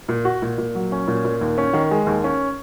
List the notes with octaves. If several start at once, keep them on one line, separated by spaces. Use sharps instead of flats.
A#2
F#4
A#2
A#2
F#3
C#4
A#2
A#2
D#2
C#4
D#3
G#3
D#2
C#4